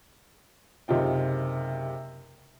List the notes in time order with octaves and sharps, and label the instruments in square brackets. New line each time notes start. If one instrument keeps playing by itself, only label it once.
[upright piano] F#1 C3 D#4 F4 G5